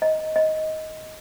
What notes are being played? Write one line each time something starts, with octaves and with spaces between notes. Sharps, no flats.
D#5
D#5